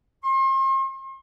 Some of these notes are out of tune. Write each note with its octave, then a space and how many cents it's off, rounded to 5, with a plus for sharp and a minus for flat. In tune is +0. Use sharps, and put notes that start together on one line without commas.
C6 +40